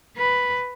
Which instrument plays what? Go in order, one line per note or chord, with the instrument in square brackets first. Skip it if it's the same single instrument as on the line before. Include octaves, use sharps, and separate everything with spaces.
[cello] B4